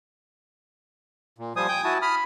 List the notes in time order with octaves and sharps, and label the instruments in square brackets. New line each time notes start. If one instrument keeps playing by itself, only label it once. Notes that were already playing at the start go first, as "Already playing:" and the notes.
[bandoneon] A#2
[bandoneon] F3 G3 C5 [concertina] G#5 D#6
[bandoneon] G5 G6
E4 F#4 A5
[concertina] B5 [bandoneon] D#6 F6